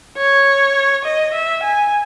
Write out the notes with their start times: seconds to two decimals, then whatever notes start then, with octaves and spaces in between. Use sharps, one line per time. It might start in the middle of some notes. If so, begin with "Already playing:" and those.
0.17 C#5
1.05 D#5
1.34 E5
1.63 G#5